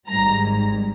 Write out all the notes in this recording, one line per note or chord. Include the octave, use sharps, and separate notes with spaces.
G#1 G#2 G3 A#5